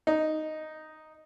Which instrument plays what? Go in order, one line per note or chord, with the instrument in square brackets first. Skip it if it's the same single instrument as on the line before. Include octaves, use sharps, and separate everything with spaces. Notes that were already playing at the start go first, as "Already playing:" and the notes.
[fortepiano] D#4